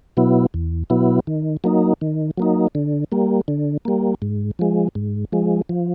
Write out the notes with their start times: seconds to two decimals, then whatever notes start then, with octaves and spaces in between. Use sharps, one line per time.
0.17 B2 F#3 B3 E4
0.54 E2
0.90 B2 F#3 B3 E4
1.27 D#3
1.64 F#3 A#3 D#4
2.01 D#3
2.38 F#3 A#3 D#4
2.75 D3
3.12 G3 A#3
3.48 D3
3.85 G3 A#3
4.22 G#2
4.59 F3 G#3
4.95 G#2
5.32 F3 G#3
5.69 F3